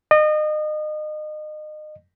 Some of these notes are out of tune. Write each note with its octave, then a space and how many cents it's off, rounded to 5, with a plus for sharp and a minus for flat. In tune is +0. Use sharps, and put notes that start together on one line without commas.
D#5 -30